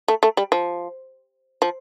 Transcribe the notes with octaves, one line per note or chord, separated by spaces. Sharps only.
A3
A3
G3
F3
F3